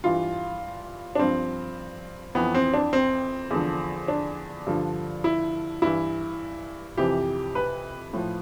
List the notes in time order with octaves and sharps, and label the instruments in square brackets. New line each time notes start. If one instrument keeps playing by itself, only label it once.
[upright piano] G2 E3 F4
D4
G2 F3 C4
F2 E3 B3
C4
D4
C4
E2 D3 F3
D4
G2 D3 F3
E4
G2 E3 E4
F2 C3 E3 G4
B4
A2 F3